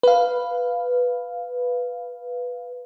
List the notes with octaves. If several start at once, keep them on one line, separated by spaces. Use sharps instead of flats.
B4 F5